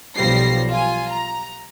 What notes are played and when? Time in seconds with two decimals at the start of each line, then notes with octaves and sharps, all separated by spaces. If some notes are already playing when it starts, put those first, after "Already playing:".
0.16 B1 F3 G3 A#6 C7
0.70 F4 G#5
1.10 A#5